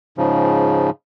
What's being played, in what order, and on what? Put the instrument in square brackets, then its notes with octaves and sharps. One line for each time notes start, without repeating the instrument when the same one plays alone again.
[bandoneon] G#2 C#3 F3